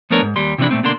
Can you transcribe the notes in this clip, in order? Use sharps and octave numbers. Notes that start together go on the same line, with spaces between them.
F3 A3 B3 D4 A#4 C#5
G#2
D#2 G3 C6
C3 E3 F3 C4 D4 E4
A#2 A3 C4
B2 D3 A#3 D4 C6